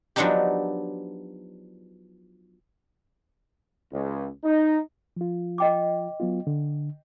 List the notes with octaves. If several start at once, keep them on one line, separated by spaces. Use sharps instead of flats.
F3 F#3 B3 D4 D#4 G4
C#2
D#4
F3 F4
D#5 G5 D6
F#3 B3 F4
D3